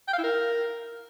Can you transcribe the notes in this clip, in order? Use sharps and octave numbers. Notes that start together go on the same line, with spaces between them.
G5
F5
E4
A#4